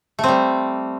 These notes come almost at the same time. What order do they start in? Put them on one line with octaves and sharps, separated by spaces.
A3 C4 G3